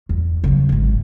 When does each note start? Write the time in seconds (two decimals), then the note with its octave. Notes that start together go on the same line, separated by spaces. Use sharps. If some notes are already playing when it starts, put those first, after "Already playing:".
0.09 E2
0.44 C#3 F#3
0.69 G#1 D#3